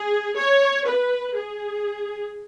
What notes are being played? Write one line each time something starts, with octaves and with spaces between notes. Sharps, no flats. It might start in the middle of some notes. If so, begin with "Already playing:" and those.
Already playing: G#4
C#5
B4
G#4